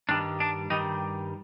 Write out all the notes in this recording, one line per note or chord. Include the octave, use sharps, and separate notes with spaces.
G2 D#3 G3 D4
D4
G2 D#3 G3 D#4